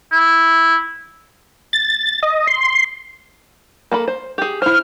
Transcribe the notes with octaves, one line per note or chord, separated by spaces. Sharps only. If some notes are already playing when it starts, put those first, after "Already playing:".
E4
A6
D#5
C6
A#3 A4 B5
C5
G4 G#4
E4 C5 F6